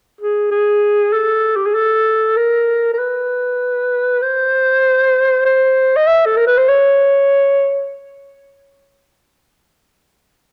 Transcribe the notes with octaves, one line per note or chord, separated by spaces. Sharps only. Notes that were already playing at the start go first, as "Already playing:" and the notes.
G#4
G#4
A4
G4
G#4
A4
A#4
A#4
B4
C5
C5
D#5
E5
A4
A#4
B4
C5
C#5